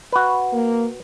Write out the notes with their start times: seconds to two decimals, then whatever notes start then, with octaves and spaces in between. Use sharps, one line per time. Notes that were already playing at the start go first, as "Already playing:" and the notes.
0.12 F#4 B4
0.53 A#3